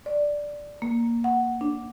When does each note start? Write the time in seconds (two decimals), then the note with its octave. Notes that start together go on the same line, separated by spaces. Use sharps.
0.06 D5
0.82 A#3
1.24 F#5
1.61 D4